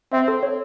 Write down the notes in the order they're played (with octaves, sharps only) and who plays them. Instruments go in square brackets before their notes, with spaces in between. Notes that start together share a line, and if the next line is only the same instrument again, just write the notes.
[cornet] C4 [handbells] E5
[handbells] A4
C#5